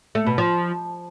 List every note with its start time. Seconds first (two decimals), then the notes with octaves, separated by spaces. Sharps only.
0.15 A3
0.27 B2
0.38 F3